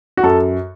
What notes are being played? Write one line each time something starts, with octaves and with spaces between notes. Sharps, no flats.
F#4
F#2 A4